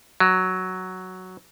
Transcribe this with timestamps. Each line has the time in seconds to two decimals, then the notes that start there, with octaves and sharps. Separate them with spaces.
0.20 F#3